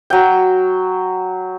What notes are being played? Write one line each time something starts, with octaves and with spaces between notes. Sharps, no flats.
F#3 G5